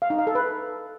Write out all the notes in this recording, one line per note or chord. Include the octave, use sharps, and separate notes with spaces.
F5
D#4
F5
A4
B4